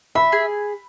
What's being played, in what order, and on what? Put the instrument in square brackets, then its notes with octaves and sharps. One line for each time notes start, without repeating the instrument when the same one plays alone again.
[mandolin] E5 [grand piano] B5
[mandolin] G#4